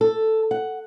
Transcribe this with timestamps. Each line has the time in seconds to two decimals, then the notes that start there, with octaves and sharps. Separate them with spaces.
0.01 A4
0.51 F#5